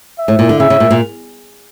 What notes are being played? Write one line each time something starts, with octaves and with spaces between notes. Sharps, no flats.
E5
A2
A#2
D3
C#3 E5
C#3
A#2
A#2